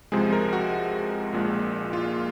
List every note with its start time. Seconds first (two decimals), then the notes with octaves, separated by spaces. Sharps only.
0.12 C#2 C3 F3 G#3 G#4
0.33 A#4
0.53 F#4
1.33 A#1 A#2 G#3
1.93 F4